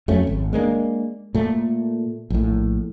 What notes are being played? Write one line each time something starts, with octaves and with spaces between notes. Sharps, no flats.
F2 F#3 A3 C#4
G#1
G#3 A#3 B3 D4
A#2 A3
A#1 A2